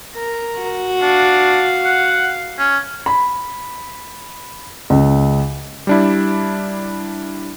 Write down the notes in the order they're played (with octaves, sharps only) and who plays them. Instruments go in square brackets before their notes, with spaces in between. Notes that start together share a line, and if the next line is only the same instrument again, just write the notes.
[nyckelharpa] A#4 A#5
[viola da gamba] F#4
[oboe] D4 [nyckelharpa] F5
[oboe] F#5
C#4
[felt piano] B5
C#2
[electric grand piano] G3 D4 E4